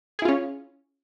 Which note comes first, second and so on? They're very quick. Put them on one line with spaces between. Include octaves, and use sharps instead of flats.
G#4 E4 F4 C#4